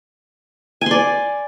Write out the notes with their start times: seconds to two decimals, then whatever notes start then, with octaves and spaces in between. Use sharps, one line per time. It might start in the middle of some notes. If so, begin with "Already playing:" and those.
0.81 G#5
0.86 C6
0.91 D5